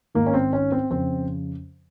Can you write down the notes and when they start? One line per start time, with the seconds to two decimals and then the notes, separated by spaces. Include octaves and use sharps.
0.15 G#2 D#3 A#3
0.26 C#4
0.34 C4
0.53 C#4
0.72 C4
0.91 F2 C#3 C4